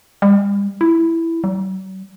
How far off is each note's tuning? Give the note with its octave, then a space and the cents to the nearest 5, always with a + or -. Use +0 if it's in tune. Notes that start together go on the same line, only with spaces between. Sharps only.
G3 +40
E4 +5
F#3 +45